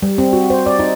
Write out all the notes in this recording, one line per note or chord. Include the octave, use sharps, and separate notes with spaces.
G3
C4
F#4
C5
D5
D#4